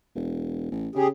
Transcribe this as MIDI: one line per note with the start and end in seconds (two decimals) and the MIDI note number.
0.15 0.69 28
0.71 0.88 33
0.95 1.10 49
0.95 1.08 67
0.95 1.08 68